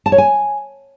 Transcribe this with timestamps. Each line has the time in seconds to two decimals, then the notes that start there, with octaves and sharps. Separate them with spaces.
0.06 A5
0.12 C#5
0.18 G#5